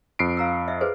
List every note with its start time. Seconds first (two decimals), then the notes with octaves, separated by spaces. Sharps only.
0.19 F2 C7 D7
0.37 F5 A#5 E6
0.68 D#5 E5
0.81 G#4 B4 C5